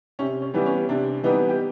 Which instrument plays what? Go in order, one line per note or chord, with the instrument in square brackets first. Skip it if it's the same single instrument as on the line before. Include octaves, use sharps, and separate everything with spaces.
[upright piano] C3 C#4
C#4
E3 G3 B3
C#4
C3 D4
E3 G3 B3 D#4
G4